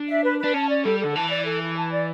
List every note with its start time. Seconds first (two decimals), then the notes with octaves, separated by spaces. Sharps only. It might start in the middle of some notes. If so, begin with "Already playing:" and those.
Already playing: D4
0.08 E5
0.24 B4
0.39 D4 B4
0.54 C#4 A5
0.70 D5
0.85 G3 A4
1.00 D3 A4
1.16 E3 A5
1.31 D5
1.46 A4
1.61 A4
1.76 A5
1.92 D5